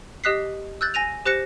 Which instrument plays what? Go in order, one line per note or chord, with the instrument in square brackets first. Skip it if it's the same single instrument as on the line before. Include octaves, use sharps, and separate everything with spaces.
[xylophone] G4 D#5 D#6 F#6 B6 C7
E6 F#6 G6 A6
G#5 A#6 D#7 F7
G4 C5 F#6 A#6 C#7 E7